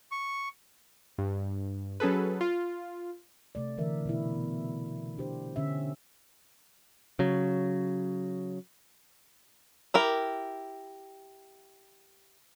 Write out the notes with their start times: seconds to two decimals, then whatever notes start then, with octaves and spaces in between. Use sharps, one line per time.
0.12 C#6
1.18 G2
2.00 F#3 C#4 G#4 A4 B4
2.41 F4
3.55 C3 A3 D5
3.78 D3 E3 A#4 E5
4.05 B2 B3 E4
5.17 D4 G4 C5
5.56 D3 C#4 E5
7.19 C#3 F#3
9.94 E4 G4 A#4